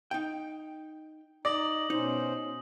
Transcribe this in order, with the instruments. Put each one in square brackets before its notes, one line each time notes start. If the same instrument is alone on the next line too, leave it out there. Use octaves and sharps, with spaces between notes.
[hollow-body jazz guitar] D#4 G5
[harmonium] D#4 [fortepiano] D5 [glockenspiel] D#6 A#6 F#7
[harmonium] B2 C#4 C5 [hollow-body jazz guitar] D#4